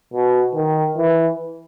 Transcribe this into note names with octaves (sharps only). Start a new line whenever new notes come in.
B2
D#3
E3